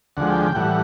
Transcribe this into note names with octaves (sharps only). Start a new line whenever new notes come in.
D2 D3 F3 G#3 F#5
G5
G5
A2 E3 G3 F#5